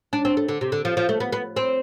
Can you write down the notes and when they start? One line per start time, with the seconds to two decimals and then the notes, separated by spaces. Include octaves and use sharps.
0.13 D4
0.25 C4
0.37 A3
0.48 D3
0.61 C3
0.72 D3
0.85 F3
0.97 F3
1.09 A3
1.20 B3
1.32 B3
1.56 C4